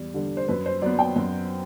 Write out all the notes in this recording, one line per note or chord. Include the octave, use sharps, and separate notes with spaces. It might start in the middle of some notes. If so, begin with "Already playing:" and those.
Already playing: E2 G3
D3 G3
C5
F#2 B4
C5
F#3 B3 D5
G5
F#2